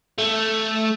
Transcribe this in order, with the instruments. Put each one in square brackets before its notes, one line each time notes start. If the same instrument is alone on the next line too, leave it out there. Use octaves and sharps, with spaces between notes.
[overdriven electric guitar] A3